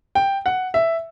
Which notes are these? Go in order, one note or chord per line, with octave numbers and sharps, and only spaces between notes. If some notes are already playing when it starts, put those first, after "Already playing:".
G5
F#5
E5